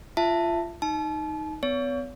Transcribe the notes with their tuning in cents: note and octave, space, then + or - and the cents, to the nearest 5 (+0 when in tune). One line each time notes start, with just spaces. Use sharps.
F4 -25 E5 +15 A5 +10
D#4 +10 A5 -35
B3 +40 C#5 +35